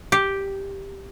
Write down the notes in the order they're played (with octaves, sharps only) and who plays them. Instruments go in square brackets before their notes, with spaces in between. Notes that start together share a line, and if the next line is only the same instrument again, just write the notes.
[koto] G4